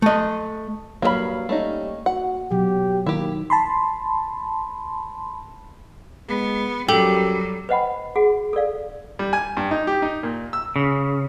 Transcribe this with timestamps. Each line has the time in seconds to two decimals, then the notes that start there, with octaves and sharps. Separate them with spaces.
0.02 A3 D#5
1.02 G2 F#3 A#3 G#4 F5 B5
1.49 G3 A3 C#4 D#4
2.06 F#4 F#5
2.51 B2 F#3 G4
3.07 D#3 A#3 E4 G4
3.50 A5 B5 C6
6.29 G#3 B3
6.89 F#2 F#3 G3 G4 A4
7.69 B4 C5 D#5 F#5 G5 B5
8.16 F#4 G#4 F#5
8.53 A4 A#4 D5 F5
9.19 G3
9.33 G#5
9.57 G2
9.71 D#4
9.87 G4
10.02 D#4
10.23 A#2
10.53 E6
10.76 C#3